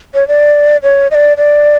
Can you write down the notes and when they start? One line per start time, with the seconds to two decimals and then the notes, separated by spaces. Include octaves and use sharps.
0.14 C#5
0.28 D5
0.83 C#5
1.11 D#5
1.15 D5
1.37 D5